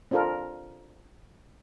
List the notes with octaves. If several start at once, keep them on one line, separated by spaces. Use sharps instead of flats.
C4 D4 F4 A4 A#4